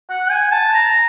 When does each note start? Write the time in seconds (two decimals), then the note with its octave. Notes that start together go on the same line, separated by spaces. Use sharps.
0.10 F#5
0.31 G#5
0.52 A5
0.74 A#5